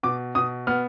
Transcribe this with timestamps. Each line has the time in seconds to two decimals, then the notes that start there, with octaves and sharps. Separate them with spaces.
0.03 B2 D6
0.35 B2 D#6
0.67 B3 F6